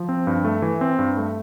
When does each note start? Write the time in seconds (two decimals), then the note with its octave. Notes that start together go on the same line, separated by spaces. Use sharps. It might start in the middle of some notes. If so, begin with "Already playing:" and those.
Already playing: F3
0.09 C4
0.27 G2
0.45 A3
0.62 E3
0.81 C4
0.99 G2
1.17 A3